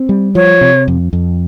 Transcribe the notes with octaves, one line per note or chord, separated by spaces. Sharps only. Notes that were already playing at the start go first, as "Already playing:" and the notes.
Already playing: C4
G3
F3 C#5
C3
F2
F2